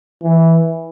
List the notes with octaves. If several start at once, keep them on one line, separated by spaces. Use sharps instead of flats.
E3